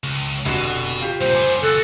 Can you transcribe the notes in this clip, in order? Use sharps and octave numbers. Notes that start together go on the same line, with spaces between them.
C#2
F1 B2 D3 F#4
F4 G4
C2 A#2 C5
F#2 B3 G#5 C6 D6
C#2 F#4 A4 F#6 A6